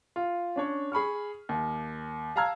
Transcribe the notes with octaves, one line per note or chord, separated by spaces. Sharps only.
F4
C#4 D4 C#5
G#4 B5 C#6 F6
D#2
F5 A5 A#5 E6 F6 G#6